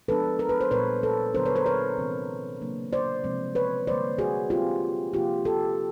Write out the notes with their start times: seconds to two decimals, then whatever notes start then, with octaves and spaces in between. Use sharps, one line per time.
0.08 F3 G#3 B3 D4 A4 B4
0.39 A#4
0.49 B4
0.61 C5
0.71 A#2 G3 B3 B4 C#5
1.03 A4 B4
1.34 D3 F#3 B3 D4 A#4 C5
1.46 B4 C#5
1.56 A#4 C5
1.66 B4 C#5
1.98 C3 E3 G#3 C4
2.61 C#3 F#3 A#3 D4
2.93 C5 D5
3.24 C3 F3 G#3 C4
3.55 B4 C#5
3.87 D3 G3 A#3 C5 D5
4.18 F#4 G#4
4.50 F3 G#3 C4 F4 G4
5.14 C3 F3 A#3 F4 G4
5.45 G4 A4